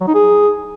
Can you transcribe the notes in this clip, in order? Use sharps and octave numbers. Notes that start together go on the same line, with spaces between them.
F#3
D#4
G#4